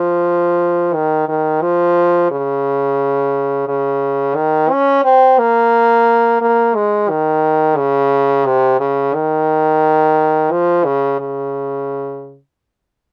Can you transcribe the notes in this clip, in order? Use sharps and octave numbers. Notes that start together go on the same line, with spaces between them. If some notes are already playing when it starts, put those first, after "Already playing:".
Already playing: F3
D#3
D#3
F3
C#3
C#3
D#3
C#4
C4
A#3
A#3
G#3
D#3
C#3
C3
C#3
D#3
F3
C#3
C#3